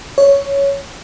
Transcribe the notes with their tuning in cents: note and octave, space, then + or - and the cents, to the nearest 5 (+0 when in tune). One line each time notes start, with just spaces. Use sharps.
C#5 +5